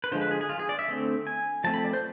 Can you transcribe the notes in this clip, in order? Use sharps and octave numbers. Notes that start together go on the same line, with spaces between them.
B4
D3 F3 G#3 C5
B4
G#4
G#4
F4
G#4
D5
E5
D3 A3 C4
G#5
F3 A3 C4 A5
B5
D5
C5